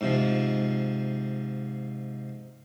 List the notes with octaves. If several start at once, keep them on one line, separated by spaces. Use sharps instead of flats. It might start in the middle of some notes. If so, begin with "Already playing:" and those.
G#2 C3 F3